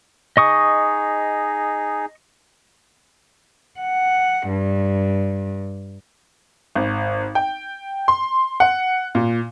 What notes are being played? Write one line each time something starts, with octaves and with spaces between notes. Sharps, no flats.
D#4 G#4 D#5 C#6 D#6
F#5
G2
G#1
G5
C6
F#5
A#2